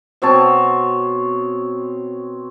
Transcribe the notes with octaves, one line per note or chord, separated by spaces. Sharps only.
B2 C4 C#5 A5